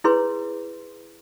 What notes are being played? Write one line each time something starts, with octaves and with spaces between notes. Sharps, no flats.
E4 G#4 B4 C#5 C6